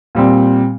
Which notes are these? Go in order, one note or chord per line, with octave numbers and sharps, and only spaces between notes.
A#2 G3 C4